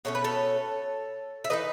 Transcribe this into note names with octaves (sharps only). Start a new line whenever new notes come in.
B2 A3 C#4 C#5
B4
A4 C#5
E5
E3 B3 D#4 B4 D#5